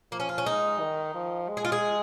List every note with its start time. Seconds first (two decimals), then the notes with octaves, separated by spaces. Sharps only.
0.12 F3 A#3
0.20 C#4
0.29 F4
0.38 C#4
0.46 G#3 D#4
0.80 D#3
1.14 F3
1.49 G#3
1.57 G#4
1.65 F4
1.72 G#4